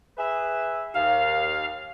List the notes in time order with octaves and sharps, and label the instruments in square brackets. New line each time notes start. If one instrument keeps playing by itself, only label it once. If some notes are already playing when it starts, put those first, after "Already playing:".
[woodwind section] G#4 B4 E5
[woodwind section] D#2 [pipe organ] F5